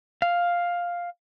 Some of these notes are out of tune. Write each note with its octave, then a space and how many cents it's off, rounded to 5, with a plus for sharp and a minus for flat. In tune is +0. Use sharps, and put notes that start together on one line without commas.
F5 +5